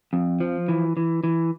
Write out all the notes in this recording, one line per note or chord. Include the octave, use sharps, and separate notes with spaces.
F2
F3
E3
E3
E3